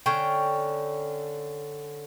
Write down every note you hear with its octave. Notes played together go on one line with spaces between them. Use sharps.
D3 C#4 G5